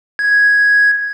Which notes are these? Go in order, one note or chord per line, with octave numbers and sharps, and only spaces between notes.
G#6